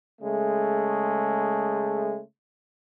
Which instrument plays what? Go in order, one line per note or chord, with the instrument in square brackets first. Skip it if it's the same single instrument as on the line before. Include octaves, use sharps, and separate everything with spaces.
[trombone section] C#3 G#3 A3